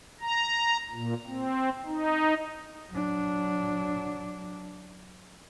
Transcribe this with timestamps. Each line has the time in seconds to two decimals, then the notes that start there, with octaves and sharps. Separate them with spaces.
0.20 A#5
0.91 A#2
1.27 C4
1.86 D#4
2.91 F#3 D4